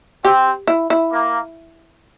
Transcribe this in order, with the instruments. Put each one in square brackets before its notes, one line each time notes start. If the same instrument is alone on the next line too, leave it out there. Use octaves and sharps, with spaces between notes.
[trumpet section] C4 [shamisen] G4
[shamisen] E4
E4
[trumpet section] A#3